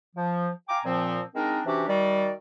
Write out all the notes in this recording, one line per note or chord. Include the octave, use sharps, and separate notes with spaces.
F3
F5 G5 G#5 A#5 D6
A#2 F3 C4
G#3 C4 D4 D#4 A#4
C3 E3 C#4 D4 F#4 G4
D#3 G3 F#4 D5